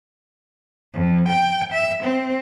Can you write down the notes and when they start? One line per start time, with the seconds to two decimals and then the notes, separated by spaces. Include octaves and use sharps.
0.94 F2
1.28 G5
1.72 E5
2.03 C4